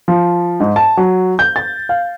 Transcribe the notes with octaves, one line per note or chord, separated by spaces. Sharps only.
F3
G#2
A5
F#3
G6
A6
F5